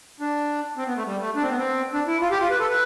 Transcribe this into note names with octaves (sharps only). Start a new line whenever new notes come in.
D4
C4
B3
A3
G3
A3
D4
C4
B3
C4
D4
E4
F4
G4
F4
B4
A4
B4